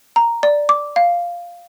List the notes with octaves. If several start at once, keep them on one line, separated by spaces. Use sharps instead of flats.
A#5
D5
D6
F5